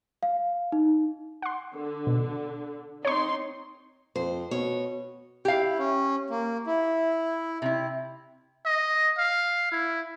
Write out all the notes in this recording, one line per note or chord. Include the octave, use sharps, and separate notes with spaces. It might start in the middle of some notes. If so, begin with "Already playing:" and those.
F5
D#4
F#5 C6
D3
B2
C4 D#4 C#5 C6 C#6
F2 C5
B2 C#5
E4 G4 F5
C#4
A#3
E4
C3 E4
D#5
F5
E4